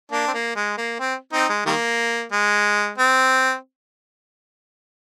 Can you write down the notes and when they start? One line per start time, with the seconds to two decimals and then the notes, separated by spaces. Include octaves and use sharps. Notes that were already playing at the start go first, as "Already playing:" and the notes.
0.12 A#3 D4
0.28 C4
0.34 A#3
0.56 G#3
0.78 A#3
1.00 C4
1.33 C4 D#4
1.49 G#3
1.66 D#3 G3 A#3
2.32 G#3
2.98 C4